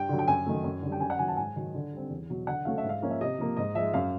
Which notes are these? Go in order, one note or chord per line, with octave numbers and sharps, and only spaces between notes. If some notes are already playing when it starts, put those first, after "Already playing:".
Already playing: G2 G5
D3 F#3
G5
F#2 G#5
D#3 F#3 A3
F#2
D3 G3
G5
F#2 G#5
F#5
D#3 F#3 G#5
A5
G#2 G#5
D#3 F#3
D3
G3 C4
E2
B2 F#3
D3 F#5
F#3 A3 C#4 F5
E5
G#2
F5
F3 A#3 C#4
E5
C3 D#5
F3 A#3
G#2 D#5
F3 G#3 E5
F#2 F5